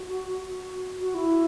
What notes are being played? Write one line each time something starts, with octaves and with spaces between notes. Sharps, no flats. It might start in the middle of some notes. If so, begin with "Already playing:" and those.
Already playing: F#4
F#4
E4